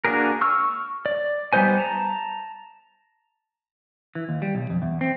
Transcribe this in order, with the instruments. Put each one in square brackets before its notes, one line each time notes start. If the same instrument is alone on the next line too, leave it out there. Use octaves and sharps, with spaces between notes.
[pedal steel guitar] A#3 D4 F#4 G#4 A#4
C#6 E6 F6
D5
G3 B3 D#4 C5 G#5
A5 A#5
[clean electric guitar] E3
D#2
G3
B1
F2
E2
C4